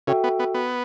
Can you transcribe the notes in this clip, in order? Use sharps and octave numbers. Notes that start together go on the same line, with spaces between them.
C#3 F#4 A4 E5 G5
B3
B3
B3